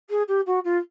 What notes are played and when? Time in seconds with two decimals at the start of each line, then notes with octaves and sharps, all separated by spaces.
0.09 G#4
0.28 G4
0.46 F#4
0.64 F4